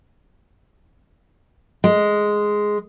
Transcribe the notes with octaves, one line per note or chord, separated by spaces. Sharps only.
G#3